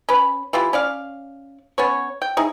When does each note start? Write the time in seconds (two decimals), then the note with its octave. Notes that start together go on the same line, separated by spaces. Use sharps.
0.09 C#4 B4
0.53 E3 F4 G4
0.73 C#4 D5 F5
1.78 B3 C#4 C#5
2.22 G5
2.37 D#4 E4 G#4